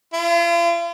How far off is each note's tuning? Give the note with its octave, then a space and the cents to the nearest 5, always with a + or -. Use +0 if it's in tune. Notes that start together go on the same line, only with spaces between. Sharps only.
F4 -40